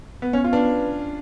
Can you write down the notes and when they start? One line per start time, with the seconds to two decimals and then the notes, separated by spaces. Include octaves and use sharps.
0.22 B3
0.33 B3 C#4
0.44 F4
0.53 D4 B4